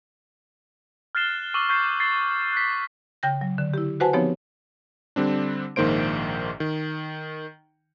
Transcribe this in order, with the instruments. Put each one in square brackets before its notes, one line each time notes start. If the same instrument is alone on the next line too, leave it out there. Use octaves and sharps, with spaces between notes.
[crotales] F6 F#6 A6 C7 E7 G7
C#6 D6 E6 F#7
C#6 G6 A6 C7
A6 C7
F#6 B6
[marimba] C#3 G5 G6 A#6
F#3
D3
E4 G4
F#4 B4 C5 F#5 G#5 A5
F3 B3 C4 D#4 G4 C#5
[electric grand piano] D3 G3 C4 D4
A#1 G#2 D#3 A#3 C5 D7
D#3